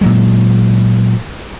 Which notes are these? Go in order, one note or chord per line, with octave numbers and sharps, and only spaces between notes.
A#2 F#3 G#3